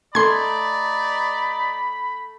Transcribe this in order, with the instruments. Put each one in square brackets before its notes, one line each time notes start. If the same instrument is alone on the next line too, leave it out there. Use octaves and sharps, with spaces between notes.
[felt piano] A3 [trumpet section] D#4 D5 [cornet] B5 [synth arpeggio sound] C6 G#6